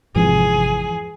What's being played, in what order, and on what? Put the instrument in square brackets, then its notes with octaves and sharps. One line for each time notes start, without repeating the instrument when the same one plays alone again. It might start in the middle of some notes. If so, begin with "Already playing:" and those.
[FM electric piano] G#1 C3 [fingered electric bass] F2 G#2 F3 [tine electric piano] E3 [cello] G#4